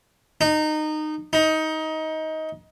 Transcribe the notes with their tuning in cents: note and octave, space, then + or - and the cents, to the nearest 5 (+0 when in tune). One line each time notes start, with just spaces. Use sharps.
D#4 -20
D#4 +20